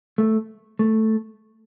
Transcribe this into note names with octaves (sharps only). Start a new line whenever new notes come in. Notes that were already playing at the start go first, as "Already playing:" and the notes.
A3
A3